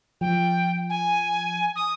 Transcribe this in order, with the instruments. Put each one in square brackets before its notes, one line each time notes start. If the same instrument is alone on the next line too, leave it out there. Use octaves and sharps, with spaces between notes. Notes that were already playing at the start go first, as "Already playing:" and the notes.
[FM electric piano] F3 [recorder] G5
[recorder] G#5
D#6